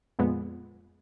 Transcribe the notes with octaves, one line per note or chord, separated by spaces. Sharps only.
F2 A#2 G#3 B3